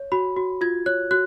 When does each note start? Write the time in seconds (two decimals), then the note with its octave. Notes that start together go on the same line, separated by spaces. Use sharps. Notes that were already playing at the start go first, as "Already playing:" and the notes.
Already playing: C#5
0.12 F#4 B5
0.37 F#4
0.61 F4 G#6
0.86 C#5 F#6
1.11 F#4 F#6